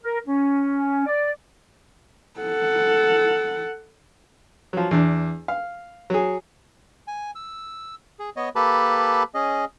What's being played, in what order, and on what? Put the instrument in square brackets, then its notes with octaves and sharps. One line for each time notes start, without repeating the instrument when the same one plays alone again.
[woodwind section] A#4
C#4
D5
[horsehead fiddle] A4 F#5
[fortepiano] F3 F#3
E2 D4
F5
F#3 G#4
[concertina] G#5
E6
G#4
B3 C#5 D#5
A#3 G4 A4 B4 A5 B5
C#4 G#4 D#5